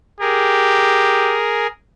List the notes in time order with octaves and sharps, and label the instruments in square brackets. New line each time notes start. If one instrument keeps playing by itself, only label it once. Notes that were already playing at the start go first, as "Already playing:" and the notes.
[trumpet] G4 [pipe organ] G#4 A#4